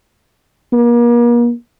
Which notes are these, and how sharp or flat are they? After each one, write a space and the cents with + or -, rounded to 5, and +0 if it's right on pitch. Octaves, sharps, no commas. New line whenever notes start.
A#3 +40